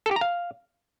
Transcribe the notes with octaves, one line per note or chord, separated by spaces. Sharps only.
A4
G4
A#5
F5